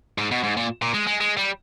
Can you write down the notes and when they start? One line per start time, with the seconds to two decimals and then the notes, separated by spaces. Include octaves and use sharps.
0.18 G#2
0.31 B2
0.44 G#2
0.57 A#2
0.82 A#2
0.94 G#3
1.07 G#3
1.20 G#3
1.37 G3